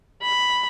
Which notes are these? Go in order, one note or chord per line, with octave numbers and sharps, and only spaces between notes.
B5